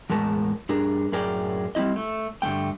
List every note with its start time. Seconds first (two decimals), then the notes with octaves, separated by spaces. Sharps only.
0.10 E2 A2 G#3 A#4 A5
0.69 G2 D4 G#4 A#4
1.12 F#2 A2 G#4 A#4 D5 G5
1.75 G3 C4 C#4 E4 D#5
1.96 A3
2.42 G2 D3 A3 A#3 G5